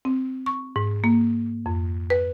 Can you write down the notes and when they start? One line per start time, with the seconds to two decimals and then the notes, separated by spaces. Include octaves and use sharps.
0.05 C4
0.46 C#6
0.76 G#2
1.04 A#3
1.66 F2
2.10 B4